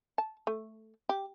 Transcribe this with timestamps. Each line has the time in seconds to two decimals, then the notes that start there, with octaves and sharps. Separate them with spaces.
0.18 A5
0.47 A3
1.09 G4